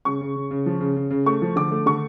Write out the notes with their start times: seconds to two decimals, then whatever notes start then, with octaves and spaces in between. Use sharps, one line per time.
0.05 C#3 C#6
0.21 C#3
0.36 C#3
0.51 C#3
0.66 F3
0.80 C#3
0.96 C#3
1.10 C#3
1.26 A3 C#6
1.42 F3
1.56 D3 D6
1.71 A3
1.86 D3 C#6